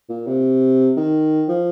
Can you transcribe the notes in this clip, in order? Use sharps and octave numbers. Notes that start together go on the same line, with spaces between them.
A#2
C3
D#3
F3